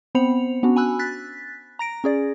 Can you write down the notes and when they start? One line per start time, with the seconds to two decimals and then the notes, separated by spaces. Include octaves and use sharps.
0.15 B3 C4 C5 B5 C#7 F7
0.63 B3 C#4 D4 F#4
0.76 G#5 B5 E6 F#6
0.99 F#6 A6 B6
1.79 A#5 A#6 D7
2.04 C#4 G#4 D5